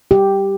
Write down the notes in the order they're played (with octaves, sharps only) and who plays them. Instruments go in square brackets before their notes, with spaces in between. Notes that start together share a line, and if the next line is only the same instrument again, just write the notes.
[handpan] G4